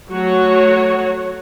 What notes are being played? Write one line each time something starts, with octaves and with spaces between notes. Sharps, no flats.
F#3 A3 F#4 C#5